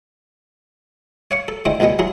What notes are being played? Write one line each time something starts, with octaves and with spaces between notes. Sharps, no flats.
C#5 F5 C#6
A4
D3 G#3 E4 C5 G5
C#2 B2 G3 G#3 B3
F#3 E4 G#4 C6